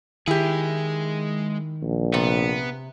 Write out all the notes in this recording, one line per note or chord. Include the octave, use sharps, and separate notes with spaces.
D#3 G#3 E4 G4 G#4
A#1
C3 B3